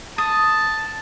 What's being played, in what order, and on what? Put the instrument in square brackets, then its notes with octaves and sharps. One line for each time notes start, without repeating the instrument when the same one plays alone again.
[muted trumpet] A5 [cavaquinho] D#6